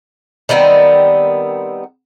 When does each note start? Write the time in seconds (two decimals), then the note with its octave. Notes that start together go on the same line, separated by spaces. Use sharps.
0.49 D#3 G3 B3 C4